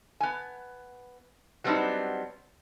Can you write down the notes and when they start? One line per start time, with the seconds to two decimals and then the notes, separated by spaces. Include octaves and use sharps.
0.20 B3 G#5
1.64 F#3 G3 B3 C4 D4 D#4